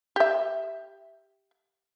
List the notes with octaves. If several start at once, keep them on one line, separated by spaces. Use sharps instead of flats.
G4 E5